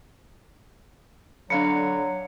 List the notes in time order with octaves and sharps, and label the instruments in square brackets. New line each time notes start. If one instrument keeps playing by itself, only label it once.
[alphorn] D3 [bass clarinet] F#3 [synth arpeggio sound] D4 F5 B5 [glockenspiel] C#7